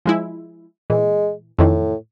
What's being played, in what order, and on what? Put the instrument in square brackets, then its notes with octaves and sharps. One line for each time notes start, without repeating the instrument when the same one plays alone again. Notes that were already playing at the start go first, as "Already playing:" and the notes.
[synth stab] F3 G#3 E4
[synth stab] A#2 E3 [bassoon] G#3
[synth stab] F2 D#3 E3 [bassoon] A2